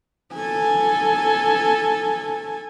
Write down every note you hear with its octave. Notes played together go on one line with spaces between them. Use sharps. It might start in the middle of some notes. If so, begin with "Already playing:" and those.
A4 G#5